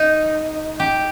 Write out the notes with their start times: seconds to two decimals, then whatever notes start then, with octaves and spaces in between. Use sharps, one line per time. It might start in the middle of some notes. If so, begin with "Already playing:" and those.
Already playing: D#4
0.80 G4